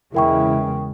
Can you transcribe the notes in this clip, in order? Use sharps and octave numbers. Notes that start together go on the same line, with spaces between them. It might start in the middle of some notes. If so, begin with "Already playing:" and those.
E2 C#3 G#3 E4 A#4 G5 C#6